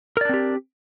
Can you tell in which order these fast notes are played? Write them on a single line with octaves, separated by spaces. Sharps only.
A#4 D5 D4 C4 G4